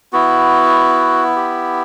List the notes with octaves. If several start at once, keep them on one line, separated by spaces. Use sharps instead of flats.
B3 E4 F#4
G4